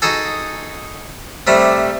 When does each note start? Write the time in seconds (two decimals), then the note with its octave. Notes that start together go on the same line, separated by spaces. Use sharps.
0.02 D#4 F#4 G#4 A4
1.47 C3 G3 A3